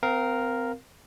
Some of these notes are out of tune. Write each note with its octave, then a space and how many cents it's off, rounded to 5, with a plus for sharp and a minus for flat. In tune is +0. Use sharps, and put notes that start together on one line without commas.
C4 -30 A#4 +0 F5 +0